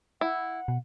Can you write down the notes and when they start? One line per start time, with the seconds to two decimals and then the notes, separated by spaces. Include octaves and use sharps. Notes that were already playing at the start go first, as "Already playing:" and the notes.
0.21 E4 F#5
0.68 B2